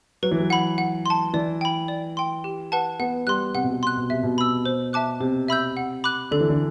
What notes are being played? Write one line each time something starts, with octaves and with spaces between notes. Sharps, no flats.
F#3 B4
E3
F#3
F#5 B5
F#5
A5 C6
E3 D5
G5 B5
D5
G5 C6
G4
B4 F#5 A5
B3 F#5
G3 C6 F#6
C3 F#5
B2
C3
C6 F#6
B2
C3 E5
B2
B5 E6
C5
E5 A5 D6 F#6
C3 C5
E5 B5 E6 G6
F#5
B5 D6 F#6
D3 A4
E3
D3